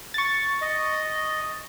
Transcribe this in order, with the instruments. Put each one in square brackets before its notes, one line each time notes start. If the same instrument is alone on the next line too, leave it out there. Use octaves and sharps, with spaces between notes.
[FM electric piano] C#6 A6
[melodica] D#5